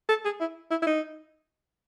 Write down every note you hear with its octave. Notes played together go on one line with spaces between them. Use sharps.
A4
G#4
E4
E4
E4
D#4